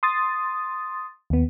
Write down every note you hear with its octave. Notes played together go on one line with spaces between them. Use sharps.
C6 D#6 A6
D#2 B3